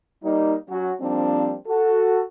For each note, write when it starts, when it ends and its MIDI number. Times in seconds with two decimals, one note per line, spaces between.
0.24 0.54 55
0.24 0.54 58
0.24 0.54 63
0.69 0.92 54
0.69 0.92 61
0.69 0.92 66
1.01 1.55 53
1.01 1.55 55
1.01 1.55 58
1.01 1.55 60
1.01 1.55 62
1.68 2.22 66
1.68 2.22 69